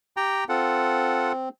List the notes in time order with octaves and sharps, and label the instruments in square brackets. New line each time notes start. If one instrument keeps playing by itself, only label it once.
[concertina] G4 G5 A#5
[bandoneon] C4 [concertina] F4 A4 F#5